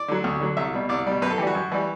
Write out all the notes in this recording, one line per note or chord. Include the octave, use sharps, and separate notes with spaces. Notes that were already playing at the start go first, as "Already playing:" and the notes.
Already playing: D5
D3 F#3
D2
D3 F#3
C2 E5
B2 G3
C2 D5
B2 G3
F#2 B4
A4
E3 G3 F#4 G4
F#2
E3 G3